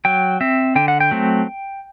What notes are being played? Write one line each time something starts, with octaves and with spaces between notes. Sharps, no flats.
F#3 G5
C4 E5
D3 G5
F#5
G5
F#3 A3 C4